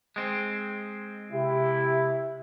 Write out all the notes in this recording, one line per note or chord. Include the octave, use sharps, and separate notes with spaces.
G#3 C4
C3 E4 G4